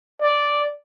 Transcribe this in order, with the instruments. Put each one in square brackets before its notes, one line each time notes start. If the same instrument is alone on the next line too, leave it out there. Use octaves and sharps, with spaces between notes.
[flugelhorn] D5